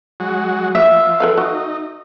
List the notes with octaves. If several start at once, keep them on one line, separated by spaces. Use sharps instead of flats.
F#3 G#3 F#4
F3 E5
A4 B4 F5
D#4 F#4